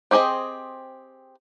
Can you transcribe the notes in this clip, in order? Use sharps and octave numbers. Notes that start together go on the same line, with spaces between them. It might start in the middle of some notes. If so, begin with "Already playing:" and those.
C4 G4 G#4 C5 D#5